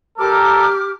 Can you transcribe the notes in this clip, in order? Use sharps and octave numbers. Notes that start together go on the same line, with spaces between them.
G3 G4 A4 A#4 D6 F6